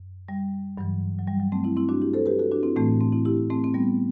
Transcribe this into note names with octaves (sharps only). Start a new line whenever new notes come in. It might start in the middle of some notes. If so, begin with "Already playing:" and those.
Already playing: F#2
G3
G2 E3 F#3
F#3
G3
F#3
A3 C4
C4 E4
C4 E4
D4 F#4
E4 G4
A4 C5
G4 B4
F#4 A4
D4 F#4
C4 E4
A2 E3 A3 C4
A3 C4
C4 E4
E4 G4
A3 C4
C4
G3 B3